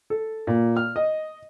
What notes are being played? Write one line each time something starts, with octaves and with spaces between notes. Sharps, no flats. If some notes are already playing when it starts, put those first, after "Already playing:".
A4
A#2
F6
D#5